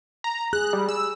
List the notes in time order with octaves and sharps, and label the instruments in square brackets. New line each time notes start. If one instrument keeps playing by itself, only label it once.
[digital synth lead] A#5
[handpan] G#4 [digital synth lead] F#6
[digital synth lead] G3
E6